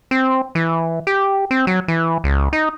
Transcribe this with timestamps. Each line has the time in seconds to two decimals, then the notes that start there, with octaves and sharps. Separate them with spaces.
0.11 C4
0.55 E3
1.07 G4
1.51 C4
1.67 F#3
1.88 E3
2.24 C#2
2.53 D#4